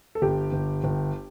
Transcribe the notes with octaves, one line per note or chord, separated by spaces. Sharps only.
A4
G1 G4
G1
G1